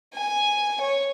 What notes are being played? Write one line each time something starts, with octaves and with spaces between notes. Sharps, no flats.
G#5
C#5